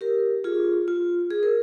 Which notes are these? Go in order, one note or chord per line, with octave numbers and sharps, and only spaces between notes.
G4 A#4
F4 G#4
F4
G#4
A#4